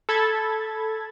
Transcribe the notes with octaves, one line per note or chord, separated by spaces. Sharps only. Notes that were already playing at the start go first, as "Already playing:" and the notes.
A4 B5 G#6 A6